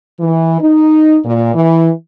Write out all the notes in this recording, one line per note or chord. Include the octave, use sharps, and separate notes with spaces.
E3
D#4
A#2
E3